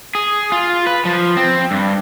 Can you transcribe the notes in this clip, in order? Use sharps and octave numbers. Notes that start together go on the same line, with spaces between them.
G#4
F4
B4
F3
C4
G2